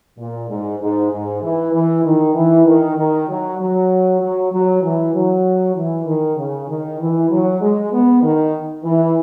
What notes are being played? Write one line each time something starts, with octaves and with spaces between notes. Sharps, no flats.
A#2
G#2
G#2
G#2
E3
E3
D#3
E3
D#3
D#3
F#3
F#3
F#3
F#3
E3
F#3
E3
D#3
C#3
D#3
E3
F#3
G#3
B3
D#3
E3